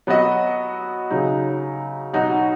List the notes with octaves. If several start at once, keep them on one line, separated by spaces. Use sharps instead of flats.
F#3 B3 F#4 D#5
C#3 F#3 D#4
B2 F#3 D#4 F#4 D#5